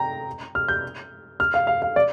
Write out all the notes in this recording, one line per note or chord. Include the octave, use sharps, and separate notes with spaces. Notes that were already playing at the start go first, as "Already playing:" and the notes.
Already playing: G5 A#5
F6
G6
F6
F5
F5
F5
D5